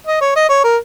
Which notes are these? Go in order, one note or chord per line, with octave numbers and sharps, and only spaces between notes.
D#5
C#5
D#5
C#5
A#4